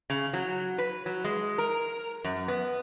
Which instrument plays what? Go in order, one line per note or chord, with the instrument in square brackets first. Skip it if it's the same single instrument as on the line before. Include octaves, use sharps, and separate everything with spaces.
[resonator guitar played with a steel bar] C#3
F#3
B4
F#3
G#3
A#4
F#2
B3